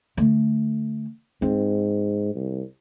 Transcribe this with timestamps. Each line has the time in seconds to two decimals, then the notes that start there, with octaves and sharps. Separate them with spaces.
0.17 D3 A3
1.42 G#2 C4
2.35 C2